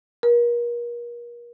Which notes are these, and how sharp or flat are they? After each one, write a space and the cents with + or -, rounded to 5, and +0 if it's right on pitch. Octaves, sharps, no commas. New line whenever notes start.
A#4 +35